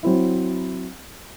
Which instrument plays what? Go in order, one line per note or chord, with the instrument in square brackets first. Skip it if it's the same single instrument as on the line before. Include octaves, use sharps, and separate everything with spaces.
[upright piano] F#3 C4 E4